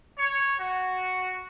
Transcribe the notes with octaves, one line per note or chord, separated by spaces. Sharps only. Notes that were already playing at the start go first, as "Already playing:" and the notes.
C#5
F#4